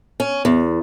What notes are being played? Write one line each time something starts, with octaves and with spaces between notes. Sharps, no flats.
C#4
E2